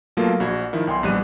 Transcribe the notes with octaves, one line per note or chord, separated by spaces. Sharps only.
B2 F#3 A3 A#3 F4
A#1 F#4 G#6
D#3 F3 E4
B1 G5 G#5 C6
A#1 E2 G3 F#6 D#7